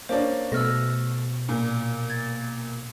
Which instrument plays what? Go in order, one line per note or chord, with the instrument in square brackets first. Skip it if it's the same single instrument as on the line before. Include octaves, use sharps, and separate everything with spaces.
[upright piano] A#3 C#4 D4 [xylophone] C5
[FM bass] B2 [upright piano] A3 [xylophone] E6 F6 A#6
[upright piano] A#2
[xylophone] G#6 A6